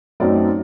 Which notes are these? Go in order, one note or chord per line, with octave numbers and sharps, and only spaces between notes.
F#2 F#3 A3 C4 D#4 D5